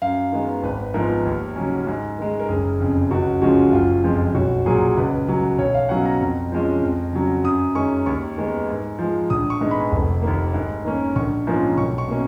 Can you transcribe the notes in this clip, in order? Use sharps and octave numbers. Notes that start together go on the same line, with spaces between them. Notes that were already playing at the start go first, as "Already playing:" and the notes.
F#2 F5
D#3 G#3 B3
G#1 B4
G#2 F3 B3 A#4
D#2
C#3 F#3 C#4
G#2
D#3 G#3
A#4
F#1 G#4
F2 C#3
C#2 F#4
C#3 F3 G#3 C#4 F#4
F#1 F4
F2 F3 G#3
B1 F#4
A#2 F#3 G#4
C#2 B4
C#3 F#3
B1 C#5
F5
B2 F#3 C#4 F#5
A#5
F2
F3 G#3 C#4
F2
C#3 F#3
F#2 D#6
D#3 G#3 C#4 C#6
D#2 C#6
D#3 G#3 B3
G#2
F3 G#3
A#1 D#6
C#6
G#2 D#3 G#3 B3
B5
F1
D#2 D#3 A#3
G#2
D#3 A#3 C#4
A#1 C#6
G#2 F3 A#3 C#4
B1 C#6
C#6
B2 A#3 C#4